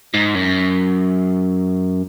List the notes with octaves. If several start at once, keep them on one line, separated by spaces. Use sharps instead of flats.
G#2
F#2